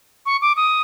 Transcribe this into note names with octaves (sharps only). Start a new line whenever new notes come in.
C#6
D6
D#6